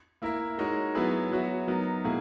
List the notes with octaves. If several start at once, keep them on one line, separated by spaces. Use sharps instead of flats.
A#3 E4 A#4 E5
G#3 D#4 F#4 A#4 C#5
F#3 B3 E4 G#4 B4
F#3 B3 F#4 C#5 E5
F#3 B3 D#4 A#4
B2 A#3 E4 G#4